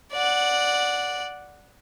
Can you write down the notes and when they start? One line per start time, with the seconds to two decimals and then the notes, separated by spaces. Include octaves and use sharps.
0.13 D5 F#5